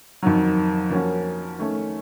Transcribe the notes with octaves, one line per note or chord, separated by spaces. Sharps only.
F2 D#3 F#3
F3 A#3 C#4 F#4
D#3 A3 C#4